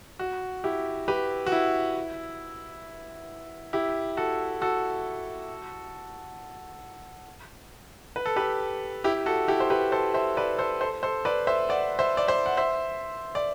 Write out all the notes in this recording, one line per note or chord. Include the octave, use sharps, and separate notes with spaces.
F#4
E4 G4
G4 B4
F#4
E4
E4 G4
F#4 A4
F#4 A4
B4
A4
G4 B4
E4 G4
F#4 A4
E4 G4
C5
G4 B4
A4 C5
C5 E5
B4 D5
A4 C5
A4 C5
A4 C5
B4 D5
C5 E5
D5 F#5
C5 E5
D5
C5 E5
F#5
C5 E5
D5